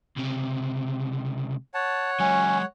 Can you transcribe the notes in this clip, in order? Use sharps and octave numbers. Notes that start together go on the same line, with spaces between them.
C#2 C3
C#5 F#5 A5
F#3 G#3 C#4